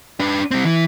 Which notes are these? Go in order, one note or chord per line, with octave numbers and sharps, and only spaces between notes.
D4 B4
G3 C4
E3